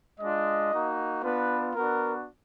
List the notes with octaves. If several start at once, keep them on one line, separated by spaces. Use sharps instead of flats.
G#3 D4 F4 D#5
A#3 D#4 F#4
B3 D4 F4 B4
B3 D4 F#4 A#4